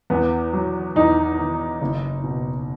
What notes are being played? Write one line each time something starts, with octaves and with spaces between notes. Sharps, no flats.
E2 B3
F#3
E2 D#4
D#3
F#1
B2